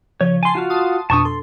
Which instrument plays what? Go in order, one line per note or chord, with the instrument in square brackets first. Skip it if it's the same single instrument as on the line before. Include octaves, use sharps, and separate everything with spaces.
[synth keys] C#3 F3 [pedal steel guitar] C#5
[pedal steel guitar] G#5 C6 [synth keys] A5 C7
[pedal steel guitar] F4 F#4 F5
[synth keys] A5 C6 D#6
[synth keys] F2 B2 D4 [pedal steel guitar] A5 C#6 D#6
[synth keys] A4 [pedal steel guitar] C6